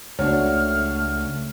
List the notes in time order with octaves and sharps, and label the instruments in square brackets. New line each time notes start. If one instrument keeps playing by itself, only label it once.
[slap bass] C#2 [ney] A3 [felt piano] D4 F#4 C#5 [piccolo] F6